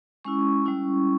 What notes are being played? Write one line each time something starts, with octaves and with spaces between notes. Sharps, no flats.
G#3 C#4 E4 C#6
G3 C#4 E4